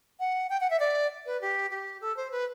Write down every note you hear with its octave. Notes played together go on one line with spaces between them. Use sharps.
F#5
G5
F#5
E5
D5
B4
G4
G4
A4
C5
B4